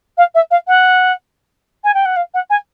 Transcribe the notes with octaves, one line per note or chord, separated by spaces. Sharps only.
F5
E5
F5
F#5
G#5
G5
F#5
F5
F#5
G#5